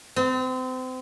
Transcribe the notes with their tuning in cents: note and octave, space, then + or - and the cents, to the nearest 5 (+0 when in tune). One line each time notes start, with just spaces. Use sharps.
C4 -30